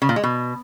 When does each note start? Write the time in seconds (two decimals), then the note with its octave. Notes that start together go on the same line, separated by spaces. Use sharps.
0.02 C#3
0.09 A#2
0.16 G#3
0.24 B2